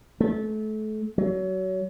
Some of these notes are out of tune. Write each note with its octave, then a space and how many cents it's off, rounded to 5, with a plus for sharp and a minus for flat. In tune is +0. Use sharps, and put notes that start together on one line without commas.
A3 -30
F#3 +25